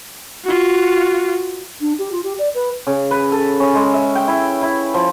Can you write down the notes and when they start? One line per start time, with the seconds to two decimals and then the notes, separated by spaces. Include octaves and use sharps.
0.44 F4 F#4
1.81 D4
1.99 G4
2.12 F4
2.24 G4
2.39 D5
2.54 B4
2.87 C#3
3.11 B4
3.32 A4
3.60 C#4
3.75 G#3
3.94 E5
4.15 G5
4.28 E4
4.62 E4
4.94 F3